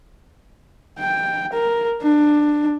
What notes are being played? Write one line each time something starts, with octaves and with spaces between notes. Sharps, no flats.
G5
A#4
D4